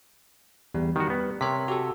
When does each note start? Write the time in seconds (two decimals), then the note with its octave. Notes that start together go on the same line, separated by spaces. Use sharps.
0.74 E2 G3
0.96 D#3 G3 F#4
1.10 B3
1.41 C3 A#4 C#5 B6
1.68 F#4 G4 A4